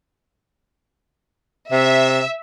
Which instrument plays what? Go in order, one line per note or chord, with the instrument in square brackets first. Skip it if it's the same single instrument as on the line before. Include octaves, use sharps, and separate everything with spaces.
[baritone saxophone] C3 [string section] E5